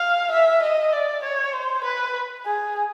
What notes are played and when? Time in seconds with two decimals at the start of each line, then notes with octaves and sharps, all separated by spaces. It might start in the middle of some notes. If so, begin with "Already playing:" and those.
Already playing: F5
0.31 E5
0.62 D#5
0.93 D5
1.23 C#5
1.53 C5
1.84 B4
2.46 G#4